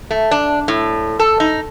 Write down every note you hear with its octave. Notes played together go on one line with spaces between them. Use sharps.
A3
D4
A2
A4
D#4